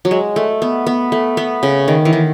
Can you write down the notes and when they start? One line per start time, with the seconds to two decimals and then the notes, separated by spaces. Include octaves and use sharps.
0.05 F#3
0.11 G#3
0.36 A3
0.62 B3
0.87 B3
1.12 A3
1.37 B3
1.63 C#3
1.88 D#3
2.05 E3
2.13 D#3